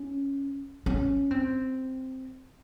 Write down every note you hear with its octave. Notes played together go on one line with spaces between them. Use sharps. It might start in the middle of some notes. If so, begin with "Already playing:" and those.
Already playing: C#4
C#4
C4